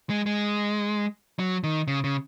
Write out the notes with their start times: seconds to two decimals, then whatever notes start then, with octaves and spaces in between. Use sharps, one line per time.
0.10 G#3
0.26 G#3
1.39 F#3
1.64 D#3
1.88 C#3
2.04 C#3